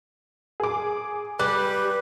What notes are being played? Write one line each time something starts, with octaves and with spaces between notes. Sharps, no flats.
G#4 D6
G3 B4 F#6